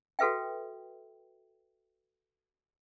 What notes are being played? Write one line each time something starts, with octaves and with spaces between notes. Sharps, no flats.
F#4 A4 B4 E5 G5